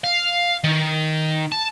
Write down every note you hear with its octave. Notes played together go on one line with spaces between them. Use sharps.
F5
D#3
A5